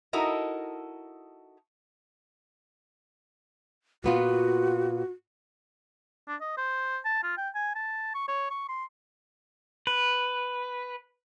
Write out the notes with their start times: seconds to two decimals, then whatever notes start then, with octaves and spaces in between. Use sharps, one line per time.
0.13 D#4 E4 F#4 A4 A#4 D#5
4.04 A#2 B3 F4 F#4
6.28 D4
6.41 D#5
6.58 C5
7.05 A5
7.23 F4
7.38 G5
7.55 G#5
7.76 A5
8.15 C#6
8.28 C#5
8.51 C#6
8.69 C6
9.87 B4